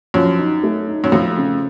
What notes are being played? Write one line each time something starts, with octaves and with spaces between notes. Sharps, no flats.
F#2 F3
D#4
A3
D#4
F#2
F2 A3
C#3